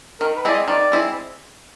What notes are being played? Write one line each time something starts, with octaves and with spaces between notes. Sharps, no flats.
D#3 A#4
B4
G#3 C4 E4 G#4 D5
D#5
D#3 D5
G#3 C4 E4 G#4